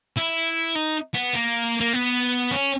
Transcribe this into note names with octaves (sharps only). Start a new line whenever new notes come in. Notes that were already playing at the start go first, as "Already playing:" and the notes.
E4
D#4
B3
A#3
A#3
B3
C#4